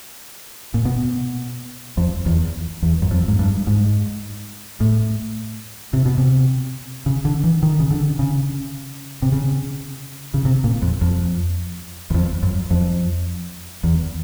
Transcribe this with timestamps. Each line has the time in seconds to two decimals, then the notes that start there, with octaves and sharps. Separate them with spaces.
0.74 A#2
0.85 B2
1.97 F2
2.26 E2
2.83 E2
3.02 F#2
3.11 F2
3.28 G#2
3.39 G2
3.67 G#2
4.80 A2
5.93 C3
6.05 B2
6.18 C3
7.06 C#3
7.25 D3
7.44 E3
7.63 D#3
7.80 C#3
7.91 D3
8.19 C#3
9.22 C3
9.32 C#3
10.34 C#3
10.45 C3
10.64 A#2
10.82 F2
11.01 F2
12.10 E2
12.14 F2
12.43 F#2
12.71 F2
13.84 E2